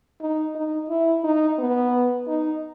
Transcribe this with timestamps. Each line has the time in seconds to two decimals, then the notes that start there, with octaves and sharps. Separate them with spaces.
0.21 D#4
0.55 D#4
0.89 E4
1.24 D#4
1.59 B3
2.28 D#4